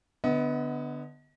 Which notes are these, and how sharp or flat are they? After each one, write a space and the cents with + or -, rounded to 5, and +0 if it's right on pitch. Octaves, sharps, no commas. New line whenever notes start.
D3 +0 B3 +0 D#5 +35